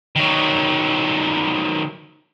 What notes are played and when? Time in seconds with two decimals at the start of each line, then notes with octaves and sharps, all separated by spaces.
0.16 D#3 F#3